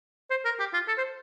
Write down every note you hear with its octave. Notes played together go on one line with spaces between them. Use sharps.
C5
A#4
G4
F4
A4
C5